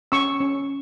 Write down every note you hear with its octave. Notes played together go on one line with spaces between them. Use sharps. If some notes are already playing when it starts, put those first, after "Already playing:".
C#4 C#6 E6
C#4